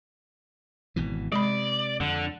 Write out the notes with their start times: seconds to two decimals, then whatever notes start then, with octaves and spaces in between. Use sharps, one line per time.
0.96 G#1 B2 E3
1.32 C3 G#3 D5 B5
2.00 F2 D3